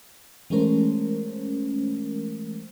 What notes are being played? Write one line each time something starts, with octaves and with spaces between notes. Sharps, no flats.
E3 G#3 A3 C#4 A#4 C5